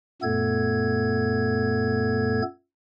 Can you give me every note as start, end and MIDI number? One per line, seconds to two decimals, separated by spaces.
0.22 2.42 42
0.22 2.42 46
0.22 2.42 57
0.22 2.42 59
0.22 2.42 69
0.22 2.42 92